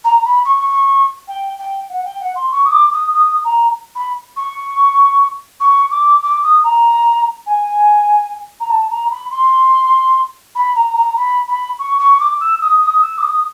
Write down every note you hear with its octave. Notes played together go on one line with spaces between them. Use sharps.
A#5
B5
C#6
G5
G5
F#5
G5
F#5
C6
C#6
D#6
D6
D#6
D#6
A#5
B5
C#6
C#6
D6
D6
D#6
A#5
G#5
A#5
A5
A#5
B5
C6
B5
A#5
A#5
B5
B5
C#6
C#6
D6
E6
D#6
D#6
E6
D6
D#6